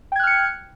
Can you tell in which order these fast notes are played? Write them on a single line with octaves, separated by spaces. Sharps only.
G5 G#6 F#6 F6 C#7